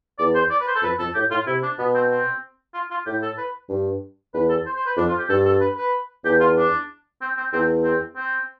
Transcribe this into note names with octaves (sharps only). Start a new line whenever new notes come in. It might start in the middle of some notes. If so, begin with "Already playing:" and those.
E2 D5
C5
D5
B4
C5
A4
F2 B4
F2 A4
A2 G4
A2 F4
C3 E4
D4
B2 B3
C4
C4
F4
F4
A2 G4
A4
B4
G2
E2 B4
A4
C5
C5
B4
F2 D4
F4
G4
G2 A4
A4
B4
B4
E2 G4
F4
D4
C4
C4
E2 C4
C4
C4